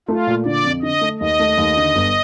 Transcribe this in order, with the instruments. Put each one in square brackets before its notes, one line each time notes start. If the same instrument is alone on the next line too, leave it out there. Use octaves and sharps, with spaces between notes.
[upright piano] A3 [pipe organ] F4
[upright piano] A#2
[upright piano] D3 [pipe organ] D5
[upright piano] F2
[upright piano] D3 [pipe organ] D#5
[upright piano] A3
[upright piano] D#2 [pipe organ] D#5
[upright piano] A3
D#2
D3
G1